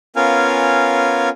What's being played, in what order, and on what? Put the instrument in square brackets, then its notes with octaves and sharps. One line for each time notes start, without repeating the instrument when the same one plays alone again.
[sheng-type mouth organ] B3 C#4 F4 A#4 F5 G#5